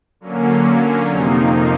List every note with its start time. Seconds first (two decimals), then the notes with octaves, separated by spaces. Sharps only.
0.20 D3 F#3 A#3 C#4
1.09 F2 C3 F3 A#3 D#4